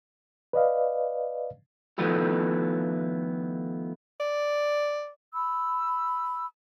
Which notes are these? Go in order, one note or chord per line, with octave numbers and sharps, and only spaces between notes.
B4 D5 D#5 F5
D#3 F3 A3 B3 E4 G4
D5
B5 E6